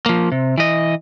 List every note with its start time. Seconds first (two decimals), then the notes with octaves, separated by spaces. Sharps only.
0.06 F3 A#3
0.32 C3
0.58 E3 D#5